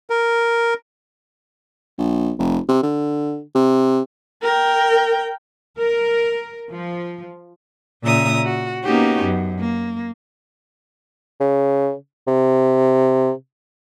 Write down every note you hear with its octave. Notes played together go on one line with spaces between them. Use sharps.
A#4
A#1
F1
C3
D3
C3
A#4 G5
A#4
F3
A#2 C#3 E5 A#5 D#6
F#4
A#3 B3 C#4 D#4 F#4 G4
F#2
A#3
C#3
C3